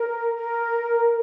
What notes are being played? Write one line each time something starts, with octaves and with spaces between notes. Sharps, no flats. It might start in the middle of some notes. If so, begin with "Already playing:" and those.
Already playing: A#4
A#4